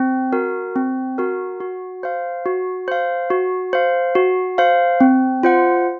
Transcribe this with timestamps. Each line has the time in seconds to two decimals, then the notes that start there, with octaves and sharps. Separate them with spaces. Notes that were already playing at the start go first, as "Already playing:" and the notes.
Already playing: C4
0.33 F#4 A#4
0.76 C4
1.18 F#4 A#4
1.60 F#4
2.03 C5 F5
2.46 F#4
2.88 C5 F5
3.30 F#4
3.73 C5 F5
4.15 F#4
4.58 C5 F5
5.01 C4
5.43 F4 C5 F#5